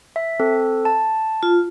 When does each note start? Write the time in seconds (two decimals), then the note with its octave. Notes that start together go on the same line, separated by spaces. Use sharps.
0.16 E5
0.40 C4 A4
0.85 A5
1.43 F4